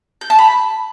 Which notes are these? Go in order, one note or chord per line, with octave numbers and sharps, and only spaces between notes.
G6
A5
B5